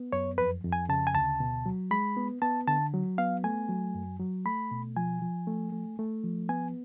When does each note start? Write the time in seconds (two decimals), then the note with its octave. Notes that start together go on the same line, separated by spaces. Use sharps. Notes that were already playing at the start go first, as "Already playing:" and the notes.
Already playing: B3
0.12 F#2 C#5
0.38 F2 B4
0.64 F2
0.73 G#5
0.89 C#3 A5
1.07 G#5
1.14 D2 A5
1.40 B2
1.66 F#3
1.91 G#3 B5
2.17 B3
2.42 B3 A5
2.67 D3 A5
2.93 F#3
3.18 B3 F5
3.44 A3 G#5
3.69 F#3
3.95 F#2
4.20 F#3
4.45 A3 B5
4.71 B2
4.96 F3 G#5
5.22 F3
5.47 A3
5.72 A3
5.99 A3
6.23 F3
6.49 B3 G#5